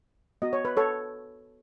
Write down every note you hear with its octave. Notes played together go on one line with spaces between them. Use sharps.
B3 F#4 D#5
C#5
B4
A4 C#5